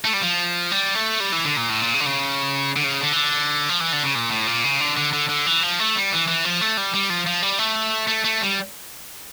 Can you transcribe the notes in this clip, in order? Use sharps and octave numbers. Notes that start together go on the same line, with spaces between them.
A3
G3
F3
G3
A3
G3
E3
D3
A#2
A2
A#2
C#3
D3
C#3
D3
C#3
D3
E3
D3
F3
E3
D3
C#3
A#2
A2
A#2
C#3
D3
D3
D3
D3
E3
F3
A3
G3
E3
E3
F3
A3
G3
G3
F3
F3
G3
A3
A3
A3
G3